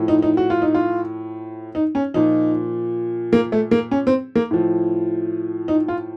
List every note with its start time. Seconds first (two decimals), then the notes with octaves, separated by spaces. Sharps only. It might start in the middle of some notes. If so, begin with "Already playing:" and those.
Already playing: A2 F3
0.08 D#4
0.22 D#4
0.37 F#4
0.50 F4
0.62 D#4
0.74 F4
1.75 D#4
1.95 C#4
2.14 A#2 F3 D#4
3.33 A#3
3.52 A3
3.71 A#3
3.91 C#4
4.07 C4
4.36 A#3
4.51 A2 F3
5.68 D#4
5.88 F4